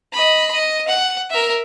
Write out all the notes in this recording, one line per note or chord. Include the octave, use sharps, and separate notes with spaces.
D#5 B5
D#5
F#5
A#4 E5